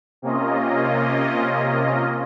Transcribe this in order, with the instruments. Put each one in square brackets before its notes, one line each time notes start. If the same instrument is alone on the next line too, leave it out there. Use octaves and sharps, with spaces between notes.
[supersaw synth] C3 A#3 C#4 F4 D#5